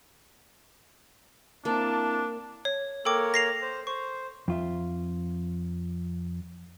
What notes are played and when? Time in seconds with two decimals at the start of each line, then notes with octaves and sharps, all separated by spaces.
1.65 A#3 C4 D4 E4 A5
2.65 C#5
3.05 A#3 A4 A#4 C#5 G5 D6
3.34 A#6 C7 F7
3.62 C5
3.87 C5 C#6
4.48 F2 F4 E5